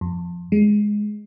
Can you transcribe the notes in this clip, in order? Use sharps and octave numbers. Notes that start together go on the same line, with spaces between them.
F2
G#3